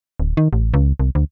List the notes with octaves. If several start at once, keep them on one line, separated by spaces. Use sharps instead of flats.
D1
D#3
A1
C#2
C2
D2